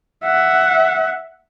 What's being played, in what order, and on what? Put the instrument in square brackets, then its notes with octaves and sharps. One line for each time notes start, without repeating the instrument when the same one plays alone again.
[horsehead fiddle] E5 F#5